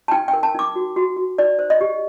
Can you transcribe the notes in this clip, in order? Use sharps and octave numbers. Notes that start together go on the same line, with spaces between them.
A5
D#4 G5
G5
A#4
A5
D#4 D6
F#4
F#4
F#4
D#4 D5
C5
D#5
G4